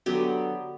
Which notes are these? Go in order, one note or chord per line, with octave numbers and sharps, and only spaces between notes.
D3 F#3 B3 G4